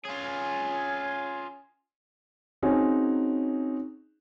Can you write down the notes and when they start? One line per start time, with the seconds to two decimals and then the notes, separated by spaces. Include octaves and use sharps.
0.05 C#4 F4 G#4 G#5
2.63 C4 C#4 D#4 F#4 G#4 C#5